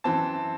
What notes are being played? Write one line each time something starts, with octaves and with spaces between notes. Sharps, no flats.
F#2 E3 C4 A5